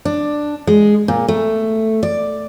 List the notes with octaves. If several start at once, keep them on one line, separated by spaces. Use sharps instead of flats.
D4
G#3
A#2
A3
D5